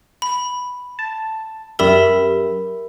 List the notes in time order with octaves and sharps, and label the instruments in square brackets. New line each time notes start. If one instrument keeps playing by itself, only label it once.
[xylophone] B5
[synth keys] A5
[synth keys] F#2 G4 [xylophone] A#4 D5 B5 [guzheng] E5